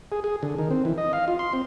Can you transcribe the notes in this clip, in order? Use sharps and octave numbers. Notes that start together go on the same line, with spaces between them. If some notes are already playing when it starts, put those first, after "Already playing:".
G#4
G#4
D3
D#3
C4
E3
D#5
F5
F4
C6
C4